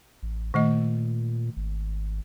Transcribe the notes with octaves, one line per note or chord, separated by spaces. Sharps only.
A1
A#2 D#3 A3 D#5
G#1